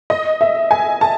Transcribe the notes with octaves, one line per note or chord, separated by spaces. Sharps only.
D#5
E5
G#5
A5